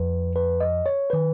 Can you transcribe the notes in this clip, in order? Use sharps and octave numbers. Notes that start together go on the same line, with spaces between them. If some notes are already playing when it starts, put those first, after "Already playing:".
Already playing: F2 F3 B4
B4
D#5
C#5
D#3 B4